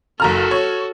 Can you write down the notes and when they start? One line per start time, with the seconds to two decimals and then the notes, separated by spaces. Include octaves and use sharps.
0.20 F#1 F#4 A4 A#5 F6
0.51 C#5